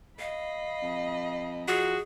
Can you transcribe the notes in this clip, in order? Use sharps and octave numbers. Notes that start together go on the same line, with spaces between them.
D#5 F5 B5
F2
F3 F#4 G#4